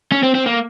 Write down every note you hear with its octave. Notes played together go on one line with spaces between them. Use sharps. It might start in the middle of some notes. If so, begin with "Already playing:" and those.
C#4
C4
C4
A#3